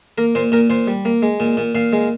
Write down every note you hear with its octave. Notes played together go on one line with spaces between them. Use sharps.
A#3 A#4
A#2 C5
A#2 A#4
A#2 C5
G3
A#3
G#3
A#2
A#2
A#2 F5
G#3